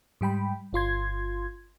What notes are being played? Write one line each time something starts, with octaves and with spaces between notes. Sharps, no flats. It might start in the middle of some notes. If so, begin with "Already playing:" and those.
G#2 G3 G5 B5
G1 F4 C6 G#6